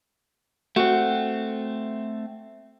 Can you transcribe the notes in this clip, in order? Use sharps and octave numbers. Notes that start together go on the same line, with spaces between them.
A3 C4 F#4